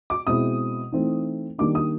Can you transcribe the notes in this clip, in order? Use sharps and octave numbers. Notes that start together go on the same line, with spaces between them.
D6
B2 G#3 C4 E4 D#6
E3 A3 C4 D#4
D#3 G3 A#3 D4 D6
D#6